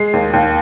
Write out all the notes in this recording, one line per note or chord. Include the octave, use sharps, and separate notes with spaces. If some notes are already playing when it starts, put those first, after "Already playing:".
Already playing: G#3 C7
D#2
D#2